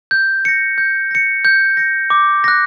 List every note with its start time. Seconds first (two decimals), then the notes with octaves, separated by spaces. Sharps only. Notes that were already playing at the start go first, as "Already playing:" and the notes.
0.11 G6
0.45 A#6 C#7
0.78 G6
1.11 A#6 C#7
1.45 G6
1.77 A#6 C#7
2.10 D6
2.44 F#6 A#6